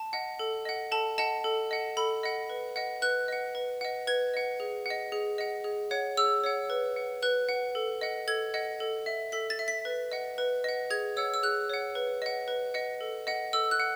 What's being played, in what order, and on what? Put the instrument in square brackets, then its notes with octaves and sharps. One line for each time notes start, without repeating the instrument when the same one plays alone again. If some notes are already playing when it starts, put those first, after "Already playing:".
Already playing: [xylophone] A5
D#5 F#5
A4
D#5 F#5
A4 A5
D#5 F#5 A5
A4
D#5 F#5
A4 B5
D#5 F#5
B4
D#5 F#5
B4 F#6
D#5 F#5
B4
D#5 F#5
B4 G#6
D#5 F#5
G#4
D#5 F#5
G#4
D#5 F#5
G#4
C#5 F#5
G#4 E6
C#5 F#5
B4
F#5
B4 F#6
F#5
A4
D#5 F#5
A4 G#6
D#5 F#5
A4
E5
A4 B6
A6
E5
B6
B4
D#5 F#5
B4
D#5 F#5
G#4 G#6
C#5 F#5 E6
E6
G#4 F#6
C#5 F#5
B4
D#5 F#5
B4
D#5 F#5
A4
D#5 F#5
A4 E6
F#6
F#5